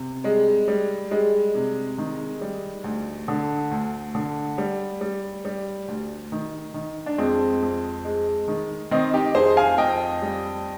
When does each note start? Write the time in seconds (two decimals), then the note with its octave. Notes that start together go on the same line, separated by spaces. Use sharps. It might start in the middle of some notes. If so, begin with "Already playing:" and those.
Already playing: C3
0.24 G3 G#3
0.68 G3
1.11 G3 G#3
1.55 C3
1.98 D#3
2.41 G3
2.84 D2
3.28 D3
3.71 D2
4.15 D3
4.58 G3
5.01 G3
5.45 G3
5.88 D2
6.32 D#3
6.74 D#3
7.06 D4
7.18 F2 G#3 C4
7.62 F2
8.05 G#3
8.48 D#3
8.91 D#3 C4 D#4
9.14 D#4 G4
9.35 F2 G#4 C5
9.57 F5 G#5
9.78 F2 D#5 G5
10.22 G3